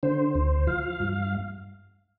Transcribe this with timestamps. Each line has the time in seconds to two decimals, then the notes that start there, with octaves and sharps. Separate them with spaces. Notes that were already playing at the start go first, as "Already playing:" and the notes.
0.03 D3 C5
0.35 D2
0.67 F3 F5
1.00 G2